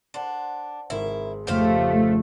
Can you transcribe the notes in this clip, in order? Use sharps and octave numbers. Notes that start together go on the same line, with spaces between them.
D4 C5 F#5 C6
G#1 E4 A#4 C5
F2 C#3 A3 G4 C5 F5